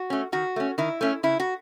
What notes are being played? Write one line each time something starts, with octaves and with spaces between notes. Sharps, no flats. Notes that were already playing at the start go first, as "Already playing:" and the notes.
Already playing: F#4
A3 C#4
D#3 F#4
A3 C#4
D#3 E4
A3 C#4
C#3 E4
F#4